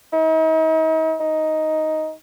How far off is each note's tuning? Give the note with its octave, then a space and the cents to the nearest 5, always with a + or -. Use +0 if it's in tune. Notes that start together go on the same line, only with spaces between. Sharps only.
D#4 +40
D#4 +10